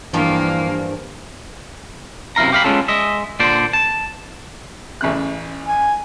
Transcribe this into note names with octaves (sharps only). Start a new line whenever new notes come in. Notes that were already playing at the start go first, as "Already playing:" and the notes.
G2 E3 F3 A#3 G5
F#2 C3 E4 F5 A#5
G4 F5 B5
G#3 A#3 B3 C#4 F4 A4
G#3 D#5 E5
A#2 D3 C5 D5
A5
A1 C#3 F#6
G#5